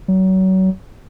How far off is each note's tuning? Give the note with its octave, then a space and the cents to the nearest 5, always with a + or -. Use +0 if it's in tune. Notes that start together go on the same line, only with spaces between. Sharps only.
F#3 +30